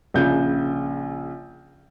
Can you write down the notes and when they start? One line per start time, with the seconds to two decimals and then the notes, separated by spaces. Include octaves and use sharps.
0.14 A#1 C#3 G6